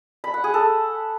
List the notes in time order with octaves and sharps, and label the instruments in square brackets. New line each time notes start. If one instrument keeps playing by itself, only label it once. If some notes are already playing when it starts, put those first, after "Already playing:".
[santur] B5
F#5
G#4
A4